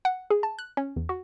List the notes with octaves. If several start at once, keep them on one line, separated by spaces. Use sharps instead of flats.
F#5
G#4
A5
F#6
C#4
E2
F#4